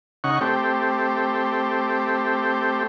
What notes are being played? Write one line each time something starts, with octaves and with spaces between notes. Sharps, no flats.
C#3 D#4 F#5 C#6
A3 C4 G4